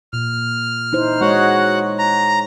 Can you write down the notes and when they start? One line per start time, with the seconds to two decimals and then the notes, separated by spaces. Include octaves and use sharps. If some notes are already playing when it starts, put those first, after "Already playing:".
0.13 A#2 F6
0.93 D#4 E4 C5
1.21 G#3 F#4 C#5 D#5 F#5
1.99 A#5